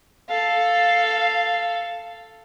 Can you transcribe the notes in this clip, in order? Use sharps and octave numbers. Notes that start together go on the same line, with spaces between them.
A4 F5